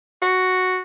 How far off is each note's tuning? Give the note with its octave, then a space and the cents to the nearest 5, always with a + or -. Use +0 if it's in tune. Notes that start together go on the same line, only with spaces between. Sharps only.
F#4 +0